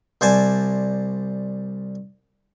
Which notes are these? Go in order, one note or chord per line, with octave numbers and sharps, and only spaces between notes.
C2 C5 D5 G#5 A5